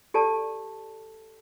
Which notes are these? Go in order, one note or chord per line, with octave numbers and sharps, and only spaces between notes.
G4 A4 D5 A5